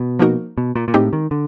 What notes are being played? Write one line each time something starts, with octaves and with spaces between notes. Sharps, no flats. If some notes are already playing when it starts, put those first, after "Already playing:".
Already playing: B2
F3 A#3 D#4 F#4 A#4
B2
A#2
A#2
A2 G#3 C4 D#4 G4
D#3
D3